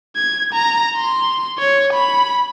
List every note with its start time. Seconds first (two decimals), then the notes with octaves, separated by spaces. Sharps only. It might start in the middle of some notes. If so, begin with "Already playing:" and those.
0.16 G#6
0.53 A#5
0.97 C6
1.59 C#5
1.93 B5